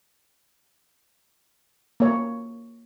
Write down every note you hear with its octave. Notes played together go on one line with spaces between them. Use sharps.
A#3 C#5